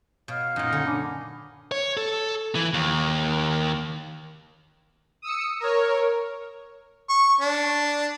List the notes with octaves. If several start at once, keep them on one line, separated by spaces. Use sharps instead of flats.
B2 C#5 F5 F6
F#2 A#2 D#4
D3 C#4
D4 G#5 B5 D6
C#5
A4
E3
D#2
D#6 E6 C#7
A#4 C#5
C#6
D4